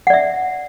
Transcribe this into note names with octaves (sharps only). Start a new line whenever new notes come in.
D5 E5 F#5